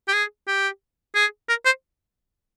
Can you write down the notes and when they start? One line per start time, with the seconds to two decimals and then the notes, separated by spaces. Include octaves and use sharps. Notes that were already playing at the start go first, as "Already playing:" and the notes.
0.08 G4
0.13 G#4
0.48 G4
1.15 G#4
1.49 A#4
1.65 C5